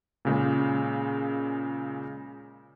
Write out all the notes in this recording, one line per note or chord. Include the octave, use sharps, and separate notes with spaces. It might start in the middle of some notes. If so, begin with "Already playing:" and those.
A#2 C#3 G#3